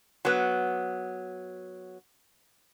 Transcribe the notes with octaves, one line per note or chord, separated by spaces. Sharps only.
F#3 B3